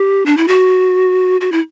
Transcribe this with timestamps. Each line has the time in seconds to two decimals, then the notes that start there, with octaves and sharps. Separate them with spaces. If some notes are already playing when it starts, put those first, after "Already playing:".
Already playing: G4
0.26 D4
0.37 E4
0.48 F#4
1.41 F#4
1.52 E4